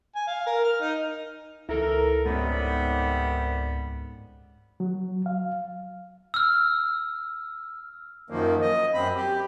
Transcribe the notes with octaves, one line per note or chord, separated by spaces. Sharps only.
G#5
F5
A#4
F6
D#4
C#2 E3 E4 A4 A#4
G#2 C3 D#3 G3 A3 B3 C#4
F#3
F5
E6 F6
F#2 D#3 F3 A#3
D#5
F#2 C4 B5
G4